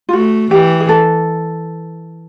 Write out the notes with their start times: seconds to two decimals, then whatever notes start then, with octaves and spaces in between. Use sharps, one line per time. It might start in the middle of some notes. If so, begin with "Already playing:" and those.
0.09 F4
0.13 A3 F#4
0.51 E3 G4
0.80 G#4
0.89 A4